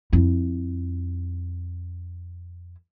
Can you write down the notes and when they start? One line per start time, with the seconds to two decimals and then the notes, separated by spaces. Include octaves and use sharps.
0.13 F2 E4